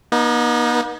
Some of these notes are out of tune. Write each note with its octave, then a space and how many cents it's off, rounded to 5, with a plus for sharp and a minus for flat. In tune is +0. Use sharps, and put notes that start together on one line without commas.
B3 -45 D#4 -5